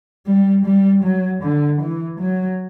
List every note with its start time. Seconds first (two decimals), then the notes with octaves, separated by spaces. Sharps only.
0.27 G3
0.66 G3
1.04 F#3
1.42 D3
1.81 E3
2.19 F#3